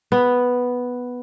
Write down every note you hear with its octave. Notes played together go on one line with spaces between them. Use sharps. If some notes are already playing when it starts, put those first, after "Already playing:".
B3